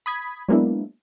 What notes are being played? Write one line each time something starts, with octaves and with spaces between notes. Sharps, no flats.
B5 D#6 G#6 B6
F#3 G#3 A#3 B3 D4 E4